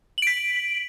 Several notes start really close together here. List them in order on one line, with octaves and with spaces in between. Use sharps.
F#7 D7 B6